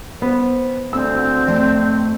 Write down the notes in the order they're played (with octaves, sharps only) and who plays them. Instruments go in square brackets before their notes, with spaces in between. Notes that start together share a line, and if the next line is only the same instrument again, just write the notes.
[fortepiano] B3 [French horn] C5
[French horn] D2 [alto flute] C4 [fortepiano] E6
[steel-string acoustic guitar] F2 A3 A4 [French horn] D5